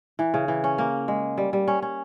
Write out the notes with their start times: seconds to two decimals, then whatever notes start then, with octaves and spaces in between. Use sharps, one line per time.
0.19 E3
0.34 C#3
0.48 E3
0.64 C#4
0.78 A#3
1.08 G#3
1.38 G3
1.53 G3
1.68 C#4
1.82 C#4